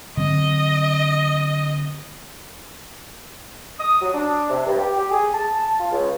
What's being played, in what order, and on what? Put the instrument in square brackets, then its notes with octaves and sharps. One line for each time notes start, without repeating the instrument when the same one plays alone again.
[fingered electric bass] D3 F#3 C4 [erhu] D#5
[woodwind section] D#6
F#3
D4
C3
G2
G4
G4
G#4
A5
F4
C#2